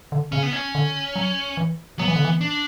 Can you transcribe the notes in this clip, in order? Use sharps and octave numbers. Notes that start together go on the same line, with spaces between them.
D3
C#3 C#4
B3
C#4
D3
F#3
E3
F#3 B3
E3
D3
E3
D4